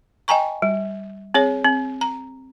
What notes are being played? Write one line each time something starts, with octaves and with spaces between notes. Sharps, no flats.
D#5 G5 G#5 A#5 C#6
G3
C4 G#4 C#5
C4
A#5